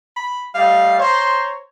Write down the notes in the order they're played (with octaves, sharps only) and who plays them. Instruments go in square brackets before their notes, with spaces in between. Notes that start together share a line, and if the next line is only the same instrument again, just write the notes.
[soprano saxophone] B5
[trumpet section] G3 A3 D#5 [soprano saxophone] F5
[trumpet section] C5 A#5 C6 [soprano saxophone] C#5